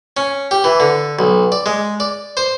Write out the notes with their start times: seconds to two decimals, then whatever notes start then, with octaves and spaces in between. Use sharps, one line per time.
0.17 C#4
0.51 G4
0.64 E3
0.80 D3
1.19 B1
1.52 D5
1.66 G#3
2.00 D5
2.37 C5